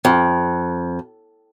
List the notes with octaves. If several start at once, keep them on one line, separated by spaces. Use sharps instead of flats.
F2